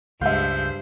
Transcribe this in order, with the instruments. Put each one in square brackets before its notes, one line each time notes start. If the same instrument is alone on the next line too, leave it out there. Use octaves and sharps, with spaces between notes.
[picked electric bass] C#2 [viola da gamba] G2 G#3 C5 [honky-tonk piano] E5 F5 [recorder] G6